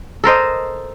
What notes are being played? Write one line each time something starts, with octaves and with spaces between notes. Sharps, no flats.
A4 A#4 C5 D#5